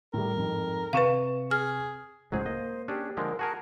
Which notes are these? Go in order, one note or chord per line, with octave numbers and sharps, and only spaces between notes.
A2 G3 A#4
F2 G#2
C3 B4 F5 C#6 E7
G#4 F6
C#2 A2 F#3 G#3 G#4 C5
A#3 D#5
C#4 D4 G4 G#4
D3 F3 G#3 A#4
F#4 G#4 A#4 A5